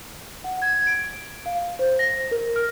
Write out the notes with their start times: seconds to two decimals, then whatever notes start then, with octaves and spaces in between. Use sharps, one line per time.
0.44 F#5
0.62 G#6
0.87 D7
1.46 F5
1.79 C5
1.99 A#6
2.31 A#4
2.56 F6